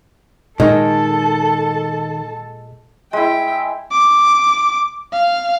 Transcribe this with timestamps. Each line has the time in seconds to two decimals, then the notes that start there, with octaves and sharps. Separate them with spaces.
0.60 A#2 D#3 G#3 A4 A5
3.13 G#3 E4 E5 G5
3.92 D6
5.13 F5